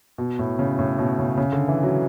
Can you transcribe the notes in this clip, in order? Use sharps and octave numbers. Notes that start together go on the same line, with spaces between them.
B2
A2
C#3
A2
B2
C#3
C#3
D3
E3
F#3